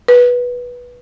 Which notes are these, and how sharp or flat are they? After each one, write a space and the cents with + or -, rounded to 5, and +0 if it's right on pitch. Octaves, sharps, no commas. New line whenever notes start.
B4 -15